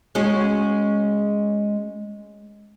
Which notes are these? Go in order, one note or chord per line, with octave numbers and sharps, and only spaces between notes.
G#3 C#4 F#4